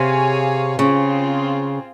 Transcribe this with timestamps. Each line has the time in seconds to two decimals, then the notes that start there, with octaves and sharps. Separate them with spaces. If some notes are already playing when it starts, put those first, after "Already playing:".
Already playing: C3 G#4 C#5 F5 G#5
0.79 C#3 C4 F4 G#4